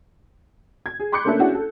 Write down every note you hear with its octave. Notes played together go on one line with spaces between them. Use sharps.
G#6
G#4
B5 C6 D6 F#6 G6 C#7
A3 A#3 C#4 D4 A4 E5
C#4 D4 E4 F#4 G#4 F#5
A4